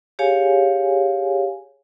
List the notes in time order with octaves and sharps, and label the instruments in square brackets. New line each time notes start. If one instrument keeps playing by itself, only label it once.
[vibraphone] G4 G#4 C#5 F5 G#5